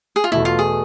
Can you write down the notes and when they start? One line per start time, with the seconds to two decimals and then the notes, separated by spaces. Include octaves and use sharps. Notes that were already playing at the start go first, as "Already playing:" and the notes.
0.16 G#4
0.24 F4
0.32 E2 B2 A3 E4
0.45 F4
0.59 G#4